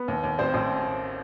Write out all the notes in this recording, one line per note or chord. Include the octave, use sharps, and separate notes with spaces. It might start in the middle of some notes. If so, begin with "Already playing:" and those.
Already playing: B3 B4
D#2
D#2
A1 C4 C5
A1